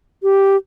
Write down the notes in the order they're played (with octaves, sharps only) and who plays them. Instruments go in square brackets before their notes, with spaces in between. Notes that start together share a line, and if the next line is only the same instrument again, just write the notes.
[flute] G4